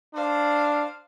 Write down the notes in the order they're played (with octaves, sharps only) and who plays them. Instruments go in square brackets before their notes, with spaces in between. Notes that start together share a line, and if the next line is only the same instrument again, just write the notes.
[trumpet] D4 [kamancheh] C5 F5